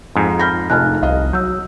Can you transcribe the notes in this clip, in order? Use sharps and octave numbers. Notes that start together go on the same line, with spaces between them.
F2 G#2
B5 F6 G6 A#6
F1 D#4 G#5 A5 F6 F#6
C2 D#5 F5
F#3 E6 G6